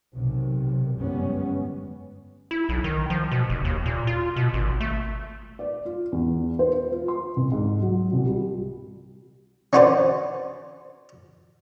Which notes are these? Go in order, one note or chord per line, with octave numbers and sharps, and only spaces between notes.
B1 C3 D#3
G1 F#2 G3 G#3 B3 C#4
E4
B1
D#3
F3
B2
F1
D#2
A#2
F4
B2
G#1
A3
D5
F4
E2
C5
B4
F4
C6
C2
G#2
F#3
C2
G3
C#4 D4 F#4 B4 C5 D5